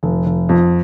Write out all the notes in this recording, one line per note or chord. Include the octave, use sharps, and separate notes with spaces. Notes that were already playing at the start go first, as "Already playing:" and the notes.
F1
F1
F2